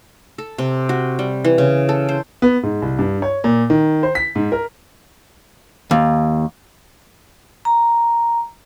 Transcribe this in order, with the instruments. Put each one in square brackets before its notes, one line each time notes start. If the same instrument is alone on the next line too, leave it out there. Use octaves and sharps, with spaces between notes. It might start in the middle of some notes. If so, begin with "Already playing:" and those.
[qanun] A4
C3
F#4
G3
E3
C#3
A4
C5
[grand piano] B3
G#2
C2
G2
C#5
A#2
D#3
C5
B6
G#2
A#4
[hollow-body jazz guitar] D#2
[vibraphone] A#5